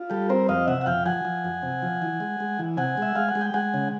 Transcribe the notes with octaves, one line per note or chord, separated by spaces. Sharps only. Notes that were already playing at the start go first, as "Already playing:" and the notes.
Already playing: F4
G3 G4 A4
C4 A#4 C5
F2 D#5 F5
C3 E5 F#5
F#5
F2 F5 G5
F3 F#5 G#5
F3
F2
C3
F3
E3
G#3
G#3
E3
C3 F#5 G#5
G#3 E5
G#3 F5
F#5
G#3
G5
G#3 F#5 G#5
C#3